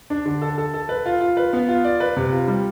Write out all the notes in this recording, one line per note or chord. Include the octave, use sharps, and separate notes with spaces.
D4
D3
A4
A4
A4
B4
F4
F4
B4
B3
F4
D5
B4
C3
F4
G3